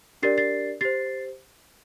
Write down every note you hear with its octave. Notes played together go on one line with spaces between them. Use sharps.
D4 G4 A#4 D5 A6 C7
A6 C7
G4 C5 A6 C7